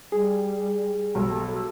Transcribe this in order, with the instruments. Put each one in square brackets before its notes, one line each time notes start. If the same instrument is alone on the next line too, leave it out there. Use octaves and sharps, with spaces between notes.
[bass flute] G3 [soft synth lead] G#4
[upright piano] B1 [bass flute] A4